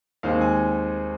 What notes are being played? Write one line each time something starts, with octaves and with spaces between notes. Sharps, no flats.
D#2 D#3 G#3 C4 F5
G#5